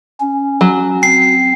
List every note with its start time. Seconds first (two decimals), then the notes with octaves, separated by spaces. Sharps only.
0.20 C#4
0.61 F#3
1.03 C4 C7